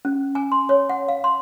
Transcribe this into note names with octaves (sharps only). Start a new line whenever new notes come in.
C#4
G#5
C6
C#5
F#5
F5
C6